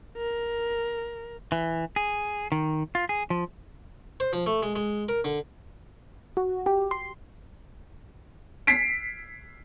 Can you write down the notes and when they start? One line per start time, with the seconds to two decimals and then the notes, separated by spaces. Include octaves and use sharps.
0.18 A#4
1.52 E3
1.96 G#4
2.52 D#3
2.95 F4
3.09 G#4
3.30 F3
4.20 C5
4.33 F3
4.46 A3
4.63 G#3
4.76 G#3
5.09 A#4
5.24 D3
6.37 F#4
6.66 G4
6.91 C6
8.67 B6 C7 D7